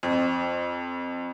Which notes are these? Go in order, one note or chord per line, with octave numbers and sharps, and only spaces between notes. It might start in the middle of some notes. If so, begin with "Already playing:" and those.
F2